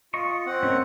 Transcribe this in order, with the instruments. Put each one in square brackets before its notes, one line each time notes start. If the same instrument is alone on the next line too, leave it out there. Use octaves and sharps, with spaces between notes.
[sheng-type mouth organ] F4 [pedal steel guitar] D#5 C#6
[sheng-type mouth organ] C4 F#5
[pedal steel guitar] C#4 A#4